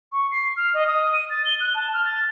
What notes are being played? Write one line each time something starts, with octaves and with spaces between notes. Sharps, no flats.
C#6
C7
F6
D#5
D#6
D#7
A6
G7
F#6
A5
F6
A6